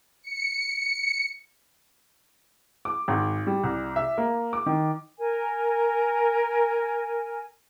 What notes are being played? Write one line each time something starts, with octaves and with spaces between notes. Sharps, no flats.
C#7
D6
G#1
G3
C2
E5
A#3
D6
D#3
A#4 G#5